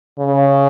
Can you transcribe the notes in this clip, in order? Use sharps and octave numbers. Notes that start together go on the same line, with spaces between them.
C#3